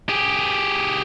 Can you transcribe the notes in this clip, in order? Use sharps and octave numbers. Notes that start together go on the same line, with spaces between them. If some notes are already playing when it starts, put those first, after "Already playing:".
G4 G#4